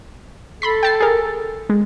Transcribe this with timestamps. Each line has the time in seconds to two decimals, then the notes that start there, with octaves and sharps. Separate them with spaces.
0.62 A4 B5 C6 B6
0.83 G5 A5 C7
1.00 G#4 A#4
1.70 G#3